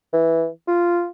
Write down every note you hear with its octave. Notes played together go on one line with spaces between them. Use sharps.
E3
F4